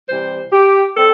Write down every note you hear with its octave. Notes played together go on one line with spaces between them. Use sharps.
C3 E3 G3 C5
G4
G3 C4 A4